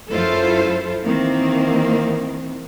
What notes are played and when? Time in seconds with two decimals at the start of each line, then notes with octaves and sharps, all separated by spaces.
0.10 F#2 E4 F4 A4 C5
1.05 D#3 E3 A#3 C4